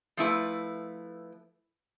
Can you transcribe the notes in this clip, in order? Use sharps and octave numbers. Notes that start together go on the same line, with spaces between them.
F3 A3 E4 B4